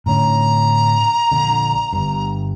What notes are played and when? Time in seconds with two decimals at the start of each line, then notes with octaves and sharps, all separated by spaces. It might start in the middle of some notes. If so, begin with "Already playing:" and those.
0.06 A2 D3 C#4 A#5
1.32 A#1 D3
1.93 G1 G2